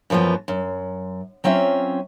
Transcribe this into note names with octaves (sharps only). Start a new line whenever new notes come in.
F#2 E3 F3 A3 B3
F#2
F#3 C4 C#4 F4 E5